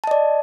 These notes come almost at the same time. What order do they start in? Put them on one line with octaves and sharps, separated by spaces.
A5 D#5 D5